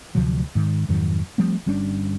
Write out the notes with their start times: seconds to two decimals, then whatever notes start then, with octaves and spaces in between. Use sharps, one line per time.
0.15 D2 C3 F3 F#3
0.55 G#2 D#3
0.88 F2 G#2 D#3 F#3
1.38 F3 G3 A3 C4
1.66 G1 G3 C#4 D4